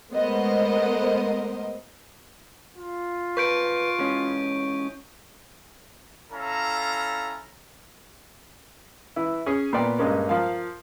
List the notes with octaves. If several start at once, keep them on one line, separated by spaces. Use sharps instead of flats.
G#3 A3 B3 A#4 C5 D#5
F4
B1 F2 B4 C#6 G6 D7
E3 G#3 C#4
C#4 E4 A4 F5 A#5
E3 E4
C#4 G#4
A#2 B3 D5 G5
G2 G#3 A#3 C#4
F3 A#4 F5